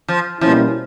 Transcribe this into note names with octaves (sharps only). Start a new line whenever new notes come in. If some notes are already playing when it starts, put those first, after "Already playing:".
F3
B2 F3 G3 A#3 C#4 E4